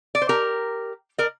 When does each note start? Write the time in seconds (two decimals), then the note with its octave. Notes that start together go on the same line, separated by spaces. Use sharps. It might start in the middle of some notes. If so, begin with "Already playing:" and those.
0.15 D5
0.22 C5
0.29 G4 A#4
1.18 A#4 D5